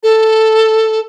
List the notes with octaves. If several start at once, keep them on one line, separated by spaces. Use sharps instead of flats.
A4